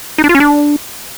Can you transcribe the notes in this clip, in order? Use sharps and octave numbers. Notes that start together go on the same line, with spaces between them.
D#4
D4
F4
C#4
D4